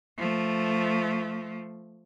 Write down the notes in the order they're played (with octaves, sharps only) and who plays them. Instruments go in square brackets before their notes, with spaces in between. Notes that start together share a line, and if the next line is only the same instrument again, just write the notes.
[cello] F3 A3